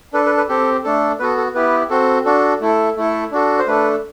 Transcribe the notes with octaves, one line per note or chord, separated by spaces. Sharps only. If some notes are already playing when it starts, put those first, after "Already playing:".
D4 A4 B4
B4
B4
C4 G4 A4
A3 D4 A4
B3 F#4 A4 B4
A4
B3 E4 G4 B4
C4 F#4 A4
D4 F#4 A4
A3 E4 A4
A3 E4 A4
D4 F#4 A4
C5
A3 D4 A4 B4